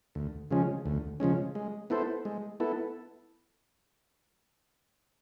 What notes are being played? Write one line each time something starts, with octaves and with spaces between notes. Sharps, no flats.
D2
C#3 F3 G#3 C#4
D2
C#3 F3 G#3 C#4
G#3
B3 E4 A4 C5
G#3
B3 E4 A4